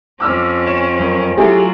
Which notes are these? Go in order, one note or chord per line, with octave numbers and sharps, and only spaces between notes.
F2 C#4 D6 E6 F6
C#5 E7
F#2
F#3 A3 E4 F4 G4 G#4